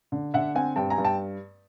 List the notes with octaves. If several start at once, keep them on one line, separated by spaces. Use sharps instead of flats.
D3
D3 E5 F#5
C4 F#5 G#5
G2 G5 A5
G#5 A#5
G2
G5 A5